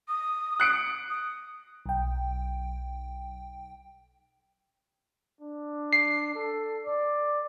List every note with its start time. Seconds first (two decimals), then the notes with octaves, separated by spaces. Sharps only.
0.08 D#6
0.60 F#6 C#7 D7
1.10 D#6
1.86 B1 G5
5.41 D4
5.93 C7
6.35 A4
6.85 D5